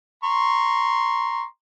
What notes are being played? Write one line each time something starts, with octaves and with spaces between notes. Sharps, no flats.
A#5 C6 C#6